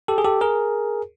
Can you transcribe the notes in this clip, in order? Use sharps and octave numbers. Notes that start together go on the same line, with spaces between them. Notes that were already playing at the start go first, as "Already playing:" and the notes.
G4 A4
G#4
G4 A4
G#4 A#4